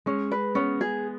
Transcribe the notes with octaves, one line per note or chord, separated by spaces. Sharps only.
G#3 C#4
B4
B3 C#4
G#4